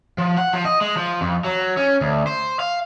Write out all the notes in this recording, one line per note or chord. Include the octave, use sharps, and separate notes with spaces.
F3
F#5
F3
D#5
G#3
F3
F2
F#3
C#4
D2
C5
F5